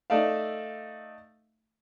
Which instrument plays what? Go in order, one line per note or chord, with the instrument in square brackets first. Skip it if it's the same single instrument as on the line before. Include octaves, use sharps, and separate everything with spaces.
[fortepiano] A3 D#4 D5 E5 F5